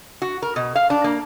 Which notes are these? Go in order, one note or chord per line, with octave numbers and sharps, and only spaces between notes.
F#4
A#4
B2
F5
D4
A#3